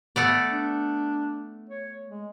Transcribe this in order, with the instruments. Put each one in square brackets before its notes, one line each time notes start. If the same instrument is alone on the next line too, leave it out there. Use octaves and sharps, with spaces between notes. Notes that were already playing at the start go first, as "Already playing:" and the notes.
[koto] A3 B3 D5
[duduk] D4
C#5
G#3